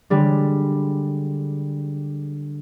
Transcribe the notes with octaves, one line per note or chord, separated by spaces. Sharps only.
D3 G3 G#3